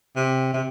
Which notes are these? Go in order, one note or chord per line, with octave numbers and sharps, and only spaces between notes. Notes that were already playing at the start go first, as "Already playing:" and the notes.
C3
C3